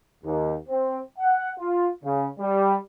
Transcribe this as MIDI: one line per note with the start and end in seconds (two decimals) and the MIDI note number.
0.24 0.54 39
0.68 0.99 60
1.18 1.50 78
1.58 1.88 65
2.03 2.27 49
2.39 2.75 55